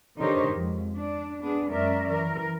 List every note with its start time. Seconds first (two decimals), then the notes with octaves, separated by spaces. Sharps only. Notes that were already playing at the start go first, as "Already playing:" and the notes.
0.18 D3 D#4 G4 A#4 C5 C#5
0.50 F2 G#2
0.95 D4
1.41 B3 D4 G#4
1.71 F#2 G#3 C#4 A#4 D5 E5
2.09 E3 A#4